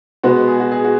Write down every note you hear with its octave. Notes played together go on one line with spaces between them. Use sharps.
B2 G#3 B3 F#4
G#4
F#4
G#4
F#4